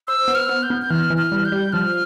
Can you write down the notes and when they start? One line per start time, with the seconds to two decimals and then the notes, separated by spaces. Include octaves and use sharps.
0.08 C5 E6
0.28 B3
0.35 F6
0.49 B3
0.63 G6
0.70 B3
0.82 G6
0.90 E3 F6
1.10 E3
1.18 F6
1.32 G3
1.45 G6
1.52 G3
1.72 F3 F6